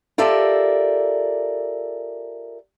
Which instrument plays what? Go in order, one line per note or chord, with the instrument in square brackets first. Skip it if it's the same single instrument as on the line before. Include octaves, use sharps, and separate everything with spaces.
[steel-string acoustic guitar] F4 G4 A4 A#4 D5 E5